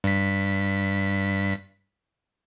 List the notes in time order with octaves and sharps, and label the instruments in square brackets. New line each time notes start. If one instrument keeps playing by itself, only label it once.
[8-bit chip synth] G2 B6